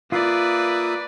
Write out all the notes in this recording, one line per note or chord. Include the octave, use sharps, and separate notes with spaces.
A#3 F4 B4 D5 E5 D#6